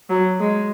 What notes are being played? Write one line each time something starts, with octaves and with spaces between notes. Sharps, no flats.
F#3
G#3